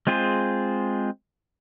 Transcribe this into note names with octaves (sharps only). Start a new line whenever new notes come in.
G#3 C4 F4 G#4 C5